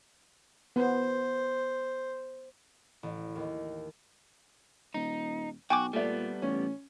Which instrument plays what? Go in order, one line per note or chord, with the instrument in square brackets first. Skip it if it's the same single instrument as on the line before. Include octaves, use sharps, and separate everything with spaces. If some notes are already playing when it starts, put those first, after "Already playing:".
[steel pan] B3 [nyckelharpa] C5
[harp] A1
D#2
[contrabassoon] D#1 [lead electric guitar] D#4
[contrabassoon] B1 [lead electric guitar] F#4 [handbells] G5 G#5 D6
[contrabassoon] A#2 [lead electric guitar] G3 B3 [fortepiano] A3 D5
[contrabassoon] A1 [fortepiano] C#4